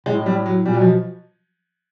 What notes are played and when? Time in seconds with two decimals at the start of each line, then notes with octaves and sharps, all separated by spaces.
0.06 A2 G#3
0.26 G3
0.46 F#3
0.66 A#2 G3
0.73 F#3
0.80 B2 F3